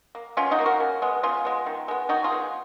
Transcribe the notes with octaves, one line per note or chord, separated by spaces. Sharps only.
A#3
B2 C#4 F4
D#4 F#4
A#3
F#4 A#4
C#3
G#3 B3
C#3 F4 G#4
G#3 B3
D#3
G#3 B3
D#3 D#4 F#4
F4 G#4
G#3 B3